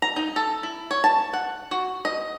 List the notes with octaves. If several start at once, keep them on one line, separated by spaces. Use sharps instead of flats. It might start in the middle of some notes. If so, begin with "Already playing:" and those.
A#5
D#4
A4
E4
C#5
A5
F#5
F#4
D#5